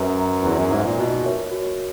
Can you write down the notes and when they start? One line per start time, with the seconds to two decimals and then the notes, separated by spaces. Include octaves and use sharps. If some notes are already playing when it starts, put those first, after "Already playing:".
Already playing: F#2 B4 E5 A#5
0.16 E5 A#5
0.43 E2 B4
0.57 F#2
0.71 G#2 E5 A#5
0.85 A#2
0.97 B2 F#4
1.25 A#4 C#5 E5
1.51 F#4